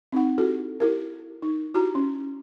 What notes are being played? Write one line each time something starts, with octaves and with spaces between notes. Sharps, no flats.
C4 D#4 F#5
E4 F#4 G4 A4
E4 G4 A#4
D#4
E4 F#4 G4 A#5
C#4